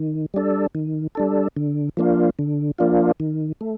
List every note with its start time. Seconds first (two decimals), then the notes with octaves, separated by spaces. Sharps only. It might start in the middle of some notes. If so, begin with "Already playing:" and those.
Already playing: D#3
0.34 G3 D4 A4
0.75 D#3
1.15 G3 D4 A4
1.57 D3
1.97 F3 A#3 D4 F4
2.39 D3
2.79 F3 A#3 D4 F4
3.20 D#3
3.61 A3